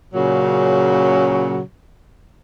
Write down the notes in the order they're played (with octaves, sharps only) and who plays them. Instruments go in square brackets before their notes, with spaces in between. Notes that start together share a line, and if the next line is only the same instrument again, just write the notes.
[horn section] A#2 C#3 F#3